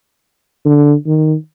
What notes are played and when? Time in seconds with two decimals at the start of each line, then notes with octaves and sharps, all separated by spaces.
0.65 D3
1.06 D#3